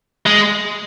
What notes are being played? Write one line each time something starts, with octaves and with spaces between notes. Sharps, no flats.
G#3